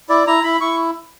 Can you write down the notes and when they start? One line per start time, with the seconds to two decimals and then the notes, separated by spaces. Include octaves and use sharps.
0.09 E4 D5
0.27 E4 A#5
0.43 E4 B5
0.61 E4 C#6